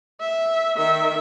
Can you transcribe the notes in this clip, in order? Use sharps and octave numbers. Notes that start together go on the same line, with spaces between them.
E5
D#3 E5